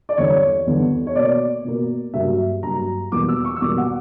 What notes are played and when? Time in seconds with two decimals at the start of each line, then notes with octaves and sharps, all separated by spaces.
0.09 D5
0.17 E2 D3 G3 B3 C#5
0.66 E2 D3 G3 B3
1.07 C#5
1.15 B2 A#3 D5
1.65 B2 A#3
2.13 G2 F#3 A#3 E5
2.63 G2 F#3 A#3 A#5
3.12 E2 B2 G3 A#3 D6
3.29 E6
3.45 C#6
3.56 E6
3.61 E2 B2 G3 A#3 D6
3.78 F#5